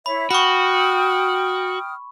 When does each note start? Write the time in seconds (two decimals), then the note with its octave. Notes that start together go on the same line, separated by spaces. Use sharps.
0.06 E4 C#5 E5 B5
0.31 F#4 G5 B5 C#6 D#6 F6